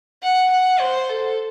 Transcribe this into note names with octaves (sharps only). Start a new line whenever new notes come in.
F#5
F#5
C5
A4